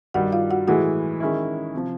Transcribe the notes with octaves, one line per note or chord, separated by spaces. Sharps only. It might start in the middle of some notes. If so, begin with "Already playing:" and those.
G2 D#3 G3 F#4 F#5
F4 F5
F#4 F#5
A2 E3 G#3 F#4 F#5
D#3 G#3 C#4 E4
C3 F3